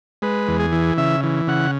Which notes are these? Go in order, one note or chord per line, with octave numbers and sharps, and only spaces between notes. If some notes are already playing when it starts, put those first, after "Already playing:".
G#3 B4
E2
G#4
E3
C#3 E5
E3
C#3 F#5